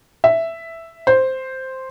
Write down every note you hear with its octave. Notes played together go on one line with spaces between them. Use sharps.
E5
C5